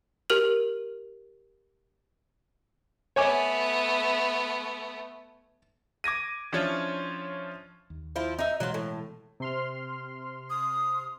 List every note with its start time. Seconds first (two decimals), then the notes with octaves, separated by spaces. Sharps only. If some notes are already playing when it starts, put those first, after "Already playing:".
0.30 G4 A#4 F6 F#7
3.16 A3 B3 C#5 G#5 D6
6.04 D6 G#6 A#6 D#7
6.52 F3 C#4 D4 E4 F4 C#5
7.90 D#2
8.16 F3 E4 F4
8.39 D#4 E5
8.60 B2 E3 F#3 G#3 F4
8.74 A2
9.40 C3 C6 F6
10.50 D#6